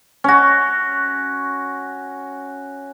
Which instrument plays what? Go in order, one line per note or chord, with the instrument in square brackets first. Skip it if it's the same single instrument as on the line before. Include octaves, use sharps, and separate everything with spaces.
[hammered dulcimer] C#4 F#4